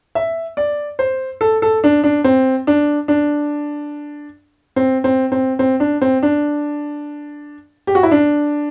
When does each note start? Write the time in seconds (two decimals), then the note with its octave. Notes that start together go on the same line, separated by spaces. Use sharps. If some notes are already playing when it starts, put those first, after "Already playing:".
0.15 E5
0.57 D5
0.99 C5
1.41 A4
1.62 A4
1.84 D4
2.04 D4
2.24 C4
2.67 D4
3.08 D4
4.76 C4
5.04 C4
5.32 C4
5.59 C4
5.80 D4
6.01 C4
6.23 D4
7.87 G4
7.95 F#4
8.03 E4
8.11 D4